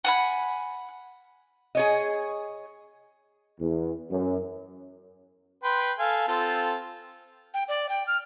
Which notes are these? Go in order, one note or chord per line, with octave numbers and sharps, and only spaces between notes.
F#5 G#5 B5
G#4 C#5 D#5
E2
F#2
B4 G5 C6
A4 F5 G#5
C4 F4 A4
G5
D5
G5
F6